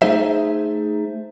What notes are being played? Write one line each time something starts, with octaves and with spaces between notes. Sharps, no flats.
A3 D#4 G#4 C5 E5